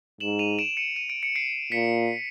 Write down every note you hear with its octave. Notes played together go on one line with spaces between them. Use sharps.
G#2 E7 F#7
D#7 F7
D7 E7
C#7 D#7
D#7
D7
C#7
C7 D7
A#2 B6 C#7